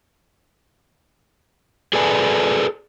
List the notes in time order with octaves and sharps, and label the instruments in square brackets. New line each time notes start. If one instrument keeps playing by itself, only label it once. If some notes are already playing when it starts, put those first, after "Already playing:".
[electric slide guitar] G#4 A4 B4 D5 G#5